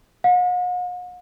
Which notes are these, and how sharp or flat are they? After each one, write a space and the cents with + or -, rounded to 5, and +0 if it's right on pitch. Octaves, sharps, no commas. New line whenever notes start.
F#5 -45